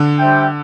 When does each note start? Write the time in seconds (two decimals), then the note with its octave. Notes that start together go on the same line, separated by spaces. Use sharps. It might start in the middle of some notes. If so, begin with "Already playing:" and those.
Already playing: D3
0.18 G3 D4 C5 E5 G5